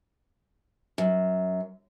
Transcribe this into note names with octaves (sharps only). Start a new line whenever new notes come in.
F#2